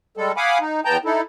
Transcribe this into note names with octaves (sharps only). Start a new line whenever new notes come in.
G3 G#3 A4
F5 F#5 G#5 B5 D6 D#6
D#4
E2 B3 G5 A5 A#5 G6
D#4 E4 A4